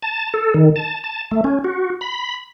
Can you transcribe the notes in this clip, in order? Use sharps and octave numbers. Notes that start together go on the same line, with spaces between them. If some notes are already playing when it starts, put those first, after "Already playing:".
A5
A4
D#3
A5
A5
A3
C#4
F#4
B5